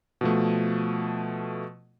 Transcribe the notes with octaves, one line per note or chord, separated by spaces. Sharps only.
B2 F3 A3